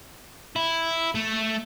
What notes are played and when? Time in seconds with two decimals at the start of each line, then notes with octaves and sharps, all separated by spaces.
0.56 E4
1.15 A3